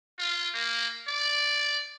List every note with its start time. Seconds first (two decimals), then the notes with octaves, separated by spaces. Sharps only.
0.19 F4
0.54 A#3
1.08 D5